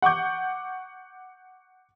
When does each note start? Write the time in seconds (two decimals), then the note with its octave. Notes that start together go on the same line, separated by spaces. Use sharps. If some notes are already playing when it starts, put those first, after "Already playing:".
0.02 F#5 C#6 D6 G6